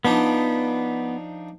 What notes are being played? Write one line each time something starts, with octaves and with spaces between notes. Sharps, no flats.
F3 B3 D4 D#4